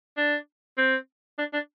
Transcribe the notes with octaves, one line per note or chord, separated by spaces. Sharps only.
D4
C4
D4
D4